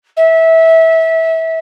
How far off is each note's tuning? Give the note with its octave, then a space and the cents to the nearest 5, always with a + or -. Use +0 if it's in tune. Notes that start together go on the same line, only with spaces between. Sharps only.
E5 -20